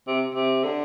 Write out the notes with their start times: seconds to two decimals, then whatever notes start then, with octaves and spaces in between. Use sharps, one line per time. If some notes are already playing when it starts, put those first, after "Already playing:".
0.07 C3
0.35 C3
0.64 D3